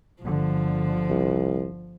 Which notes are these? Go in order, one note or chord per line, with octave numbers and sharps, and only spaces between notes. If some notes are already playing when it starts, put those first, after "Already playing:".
G1 D3 F3
C2